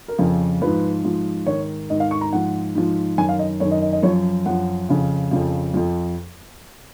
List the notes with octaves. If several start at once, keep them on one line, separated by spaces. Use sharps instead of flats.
A#4
F2 C#3 F3
G#2 F3 B4
G#2 F3
G#2 D#3 C#5
G#2 D#3 D#5
F5
C#6
A#5
G#2 F3 F#5
G#2 F3
F#2 D#3 G#5
F5
D#5
F#2 D#3 C#5
D#5
D#5
D#5
F#2 F3 C#5
F#2 F3 F#5
F2 C#3 F3
F2 C#3 F3
F2 F3